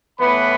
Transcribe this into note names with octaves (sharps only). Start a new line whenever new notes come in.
A2 E3 B3 B4 B5